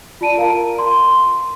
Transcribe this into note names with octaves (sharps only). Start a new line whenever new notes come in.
F4 D5 A5 D7 D#7
A#4 F5 A#5
C6